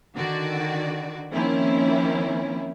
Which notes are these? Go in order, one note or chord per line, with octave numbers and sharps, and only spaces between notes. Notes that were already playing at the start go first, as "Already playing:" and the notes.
D3 D#3 F#4 D5
D#3 F3 A#3 C4 C#4 E4